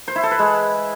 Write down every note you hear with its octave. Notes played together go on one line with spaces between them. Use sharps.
C5
E4
A4
B4
G#3